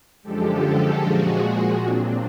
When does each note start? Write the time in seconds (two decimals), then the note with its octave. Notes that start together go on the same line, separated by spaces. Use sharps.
0.23 F#2 D3 F3 G#3 G4 A4
1.02 A#2 F3 G#3 F#4 G#4
1.81 A#2 F#3 C4 D4